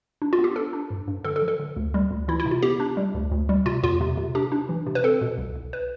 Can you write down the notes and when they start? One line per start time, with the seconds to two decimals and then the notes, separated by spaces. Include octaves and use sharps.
0.22 D4
0.33 F4
0.39 B3
0.44 G4
0.56 D4 A4
0.73 D4
0.90 G2
1.08 G2
1.24 D3 A4
1.36 A4
1.42 F3
1.48 A4
1.60 D3
1.76 D2
1.94 G3
2.11 D2
2.28 E3 E4
2.40 E4
2.46 C3
2.51 F4
2.63 B3 G4
2.80 D4
2.97 G3
3.15 D2
3.32 D2
3.49 G3
3.66 C3 F4
3.83 E2 F4
4.01 C3
4.17 C3
4.35 D4 G4
4.52 D4
4.69 E3
4.87 C3
4.95 B4
5.04 C4 A4
5.21 B2
5.38 C2
5.56 C2
5.73 B4